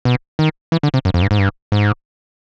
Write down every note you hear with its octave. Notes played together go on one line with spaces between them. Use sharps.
B2
D#3
E3
D3
C3
F#2
F2
G2
G#2
G2
G#2